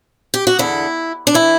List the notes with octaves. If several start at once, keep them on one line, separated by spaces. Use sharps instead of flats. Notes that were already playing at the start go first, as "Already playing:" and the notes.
G4
F#4
E2 D3 E4
D4
E3 E4